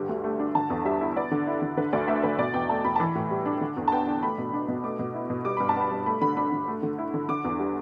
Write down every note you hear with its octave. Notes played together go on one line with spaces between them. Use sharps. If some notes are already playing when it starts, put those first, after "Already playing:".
Already playing: G2 D3 G4
D2
A3 G4
D4
D3 A5
E2
G3 E5
E4
B3 D5
D3
E4
D3
D3 B4
D2 D5
A3 E5
D2 B4
B2 D5
E2 G5
A3 A5
E2 B5
A5
E3 B5
A2
G3
D4
D3
E2
A5
B3 G5
D4
A3 B5
B2
D4
B2
A3 D6
B2
E4
B2
G3 D6
G2 B5
A5
B3 B5
G2
A3 B5
D3 B5
D4 B5
D3
A3
D3
E4
D3
D3 D6
E2
G3